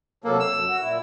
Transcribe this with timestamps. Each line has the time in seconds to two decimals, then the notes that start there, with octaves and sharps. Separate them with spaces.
0.24 C3 F#3 A#3 A4
0.40 E6
0.51 F#2
0.67 F#4
0.81 A#2 E4